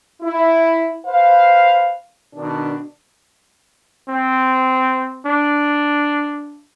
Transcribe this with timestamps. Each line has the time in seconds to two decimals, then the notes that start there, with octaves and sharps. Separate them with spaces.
0.22 E4
1.06 B4 C5 F5
2.34 B2 D#3 D4
4.08 C4
5.26 D4